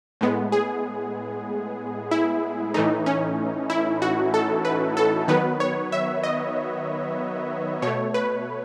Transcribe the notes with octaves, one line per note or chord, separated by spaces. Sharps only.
A2 G#3 B3
G#4
E4
A2 E3 A3 D#4
C#4
E4
F#4
A4
B4
A4
D#3 F#3 B3 B4
C#5
E5
D#5
B2 A3 C#5
B4